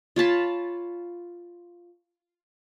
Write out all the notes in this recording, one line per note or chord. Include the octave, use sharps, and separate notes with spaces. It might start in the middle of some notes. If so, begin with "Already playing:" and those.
F4 C#5 A5 B5